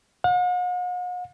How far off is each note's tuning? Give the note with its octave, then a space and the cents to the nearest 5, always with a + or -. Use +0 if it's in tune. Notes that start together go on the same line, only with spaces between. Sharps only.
F#5 -45